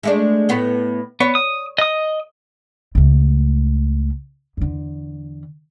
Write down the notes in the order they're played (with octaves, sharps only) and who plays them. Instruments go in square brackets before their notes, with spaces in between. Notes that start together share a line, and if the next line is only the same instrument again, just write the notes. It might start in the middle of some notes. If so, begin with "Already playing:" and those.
[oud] G#3 A3 D4
A2 B3
[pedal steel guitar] B3 [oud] C#5
[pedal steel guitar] D#6
D#5 D#6
[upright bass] C#2 A3
E2 D3